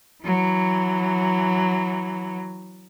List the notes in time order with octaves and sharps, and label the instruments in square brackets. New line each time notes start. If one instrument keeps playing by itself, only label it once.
[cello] E3 F#3